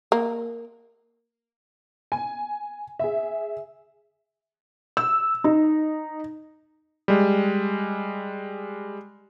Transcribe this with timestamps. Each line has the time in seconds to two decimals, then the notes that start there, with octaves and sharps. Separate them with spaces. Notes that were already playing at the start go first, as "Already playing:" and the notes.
0.12 A#3
2.12 G#5
2.99 G#4 E5
4.97 E6
5.44 D#4
7.08 G3 G#3